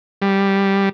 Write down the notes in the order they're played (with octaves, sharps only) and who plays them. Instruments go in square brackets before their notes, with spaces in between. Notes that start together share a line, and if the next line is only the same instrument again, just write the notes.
[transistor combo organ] G3